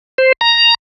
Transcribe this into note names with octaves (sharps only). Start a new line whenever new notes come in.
C5
A#5